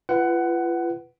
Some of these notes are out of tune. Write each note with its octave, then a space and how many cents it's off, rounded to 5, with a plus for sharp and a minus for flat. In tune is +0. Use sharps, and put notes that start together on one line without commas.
F4 -40 B4 +0 F#5 +15